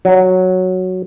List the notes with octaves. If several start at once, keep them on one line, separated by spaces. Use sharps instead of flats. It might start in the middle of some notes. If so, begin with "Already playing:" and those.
F#3